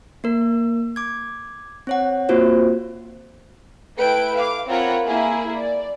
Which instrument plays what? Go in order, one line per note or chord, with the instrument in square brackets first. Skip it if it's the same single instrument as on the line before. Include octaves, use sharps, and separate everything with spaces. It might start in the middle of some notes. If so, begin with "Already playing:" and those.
[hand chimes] A#3 A#4
D6 G#6
C4 C#5 F#5
A#3 C4 F4 F#4 C5
[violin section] A3 E4 B4 G5 D7
F5 D6
C4 F4 A#4 C#5 F#5 B5
A#3 E4 G#4
D5